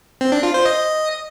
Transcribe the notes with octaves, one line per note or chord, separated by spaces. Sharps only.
C4
D4
F4
C5
D#5